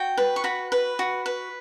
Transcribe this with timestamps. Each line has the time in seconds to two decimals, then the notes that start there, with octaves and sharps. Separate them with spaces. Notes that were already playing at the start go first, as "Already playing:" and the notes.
Already playing: F#4 G5
0.17 B4
0.36 C#6
0.44 F#4 B5
0.72 B4
0.99 F#4
1.26 B4